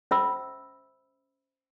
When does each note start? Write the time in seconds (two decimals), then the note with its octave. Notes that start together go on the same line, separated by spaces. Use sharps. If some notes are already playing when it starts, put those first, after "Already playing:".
0.11 C#4 C5 E5 B5 E6